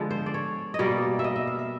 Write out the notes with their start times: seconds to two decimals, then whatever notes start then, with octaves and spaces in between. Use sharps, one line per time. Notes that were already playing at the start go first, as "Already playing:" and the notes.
Already playing: D3 F3 G#3 B3
0.11 C5
0.26 D5
0.34 C#5
0.74 D#5
0.79 B2 G3 A#3 D5
1.19 E5
1.24 D#5
1.36 E5
1.47 F5
1.59 E5